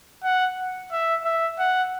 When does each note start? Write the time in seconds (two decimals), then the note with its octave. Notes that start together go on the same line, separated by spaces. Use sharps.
0.24 F#5
0.92 E5
1.25 E5
1.59 F#5